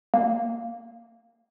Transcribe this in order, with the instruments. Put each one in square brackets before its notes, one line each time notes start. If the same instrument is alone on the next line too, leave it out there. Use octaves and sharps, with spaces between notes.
[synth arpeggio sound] A#3